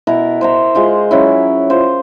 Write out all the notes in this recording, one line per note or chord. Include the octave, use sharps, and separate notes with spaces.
B2 E4 A#4
C5 E5 A#5
G#3 F4 C5
F#3 C#4 E4
F4 C5